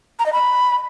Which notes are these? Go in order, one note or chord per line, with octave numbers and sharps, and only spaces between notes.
A#5
D#5
B5